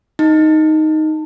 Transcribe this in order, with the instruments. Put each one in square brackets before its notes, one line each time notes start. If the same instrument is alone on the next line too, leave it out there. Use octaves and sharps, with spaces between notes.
[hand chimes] D#4